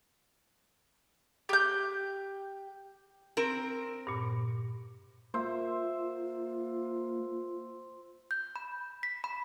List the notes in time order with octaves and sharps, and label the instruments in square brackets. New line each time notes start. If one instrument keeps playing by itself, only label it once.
[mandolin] G4 G6
[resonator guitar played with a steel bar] C4 A#4
[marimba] G2 A#2
[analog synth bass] A#3 [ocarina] F4 [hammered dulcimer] C5 E5
[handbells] G6
B5
B6
B5